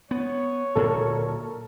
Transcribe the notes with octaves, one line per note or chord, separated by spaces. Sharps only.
B3 C#5
D1 A#2 A4 A#4